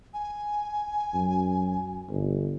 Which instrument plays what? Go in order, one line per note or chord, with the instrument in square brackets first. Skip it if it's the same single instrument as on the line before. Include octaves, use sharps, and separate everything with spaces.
[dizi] G#5
[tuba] F#2
G1